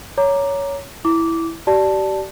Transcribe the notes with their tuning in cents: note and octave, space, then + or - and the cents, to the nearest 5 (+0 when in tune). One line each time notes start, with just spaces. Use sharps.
C#5 +10 A#5 +0 D6 +5
E4 +0 D6 -15
G4 -35 D5 +0 A5 +0